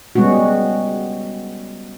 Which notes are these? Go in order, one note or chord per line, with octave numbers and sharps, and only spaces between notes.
G3 G#3 B3 C#4 F#4